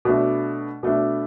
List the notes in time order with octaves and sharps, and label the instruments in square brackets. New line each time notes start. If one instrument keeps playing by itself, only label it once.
[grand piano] B2 A3 D4
B2 A3 D4